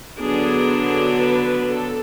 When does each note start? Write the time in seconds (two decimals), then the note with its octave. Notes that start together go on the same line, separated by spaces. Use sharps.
0.20 D3 F#3 B3 D4 G#4
1.19 B4
1.68 A4